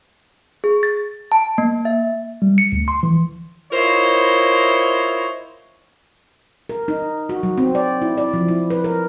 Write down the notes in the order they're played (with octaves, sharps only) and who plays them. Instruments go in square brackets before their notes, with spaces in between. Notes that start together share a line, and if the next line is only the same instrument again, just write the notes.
[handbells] G#4
A6
A5
A#3
E5
[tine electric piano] G3
C#7
D2
C6
E3
[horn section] E4 F4 A#4 C5 C#5 D#5
[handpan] A#4
D#4
F#4
F#3
C4
D5
E4
D5
F3
E4
B4
A#4